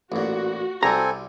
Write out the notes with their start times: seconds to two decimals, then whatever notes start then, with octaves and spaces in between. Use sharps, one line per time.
0.12 A1 A#2 F#4
0.83 C2 G3 C4 A4 G#5 A#5